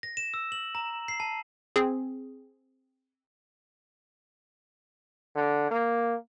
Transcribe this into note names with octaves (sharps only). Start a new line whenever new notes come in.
A#6
E7
E6
F#7
A#5
C7
A5
C4 G#4
D3
A#3